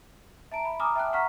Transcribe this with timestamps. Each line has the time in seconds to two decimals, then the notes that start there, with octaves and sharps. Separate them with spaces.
0.52 E5 A5 A#5 D7
0.65 B5
0.80 G#5 A#5 D6 D#6 F6
0.96 E5 G5 A5 F#6
1.13 F#5 A#5 C#6 F6 B6